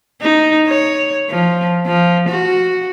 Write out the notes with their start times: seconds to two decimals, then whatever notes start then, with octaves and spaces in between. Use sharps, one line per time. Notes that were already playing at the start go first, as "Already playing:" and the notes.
0.22 D#4
0.68 C#5
1.30 F3
1.86 F3
2.29 F#4